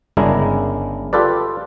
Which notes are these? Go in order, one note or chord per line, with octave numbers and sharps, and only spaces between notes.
G1 C#3 G#3 D4 E4 A#4
F4 G4 A4 B4 D5